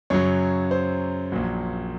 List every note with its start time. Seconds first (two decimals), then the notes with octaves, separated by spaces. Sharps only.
0.10 F#2 C#3 F#3 C#5
0.71 C5
1.32 A#1 A#2 F#3